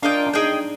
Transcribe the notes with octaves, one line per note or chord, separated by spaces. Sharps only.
D4 F4 A#4 D#5 G5
D4
D#4 G#4 D#5 G5